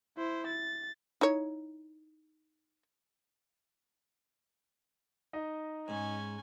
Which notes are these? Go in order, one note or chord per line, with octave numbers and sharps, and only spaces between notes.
E4 C5
A6
D#4 E4 C#5
D#4 D#5
G#2 C#4 G#5